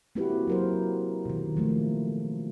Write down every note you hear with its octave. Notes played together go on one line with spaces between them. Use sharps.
A#3 C4 E4 F#4 G4 B4
F#3 A#4 C5
B2 D#3
F3 A3 A#3